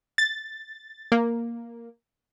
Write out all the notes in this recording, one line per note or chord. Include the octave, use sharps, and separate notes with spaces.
A6
A#3